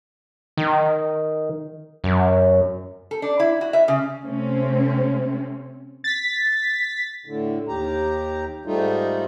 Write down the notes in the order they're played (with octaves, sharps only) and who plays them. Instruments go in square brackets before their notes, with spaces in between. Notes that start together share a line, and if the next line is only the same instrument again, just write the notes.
[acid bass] D#3
F#2
[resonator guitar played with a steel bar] A4
D4
E4
F#4
E5
C#3
[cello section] C3 A3 C4 C#4
[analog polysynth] A6 B6
[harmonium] A2 D3
D#2 G4 A#5
G#2 G3 A3 D#4 F4